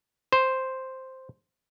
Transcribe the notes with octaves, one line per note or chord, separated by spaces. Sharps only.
C5